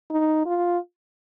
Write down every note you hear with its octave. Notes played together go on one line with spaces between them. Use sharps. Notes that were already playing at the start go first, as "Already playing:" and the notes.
D#4
F4